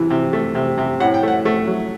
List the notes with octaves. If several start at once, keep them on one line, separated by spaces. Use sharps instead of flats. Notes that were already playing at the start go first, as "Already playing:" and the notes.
Already playing: C3 E3
C3
A3
C3
C3
A2 F#5
G5
A3 F#5
A3
F#3